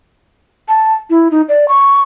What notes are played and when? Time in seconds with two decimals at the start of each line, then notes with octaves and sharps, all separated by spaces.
0.68 A5
1.10 E4
1.31 D#4
1.49 D5
1.68 C#6